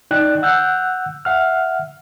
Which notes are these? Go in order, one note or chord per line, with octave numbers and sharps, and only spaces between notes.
D#4 D5 G5 F#6
F#5 E6 F#6 G6
E5 F#5 F6